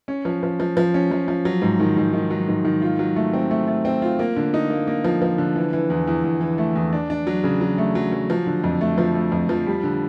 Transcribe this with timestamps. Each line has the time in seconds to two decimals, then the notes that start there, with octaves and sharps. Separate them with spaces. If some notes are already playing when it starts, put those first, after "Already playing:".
0.08 C#4
0.25 F3
0.43 F3
0.60 F3
0.77 F3
0.94 C#4
1.11 F3
1.28 F3
1.45 F#3
1.62 G#2
1.80 D#3
1.97 G#2
2.13 D#3
2.30 F#3
2.48 G#2
2.65 D#3
2.82 F4
2.99 F#3
3.16 A3
3.33 C4
3.51 A3
3.68 A3
3.85 C4
4.02 F4
4.19 A#3
4.36 D3
4.54 D#4
4.70 A#3
4.87 A#3
5.04 F3
5.22 F3
5.38 D3
5.56 E3
5.73 E3
5.90 E2
6.07 E2
6.24 E2
6.41 E3
6.58 A3
6.76 E2
6.93 D4
7.10 D4
7.27 F#3
7.44 C#3
7.61 F#3
7.78 A3
7.95 F#3
8.12 F#3
8.30 F3
8.46 D3
8.64 F2
8.81 A3
8.98 F3
9.15 A3
9.32 F2
9.49 F3
9.66 G3
9.83 D3